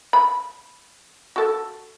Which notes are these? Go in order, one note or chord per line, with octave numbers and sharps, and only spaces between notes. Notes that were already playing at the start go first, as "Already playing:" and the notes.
B5
F#4 A4